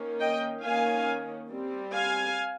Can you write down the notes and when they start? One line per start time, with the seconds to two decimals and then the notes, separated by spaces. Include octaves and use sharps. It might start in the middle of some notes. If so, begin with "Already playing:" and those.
Already playing: D#3 A#3 C#4
0.20 D#5 G5
0.63 D#3 A#3 C#4 F5 G#5
1.50 G3 C4
1.93 F5 G#5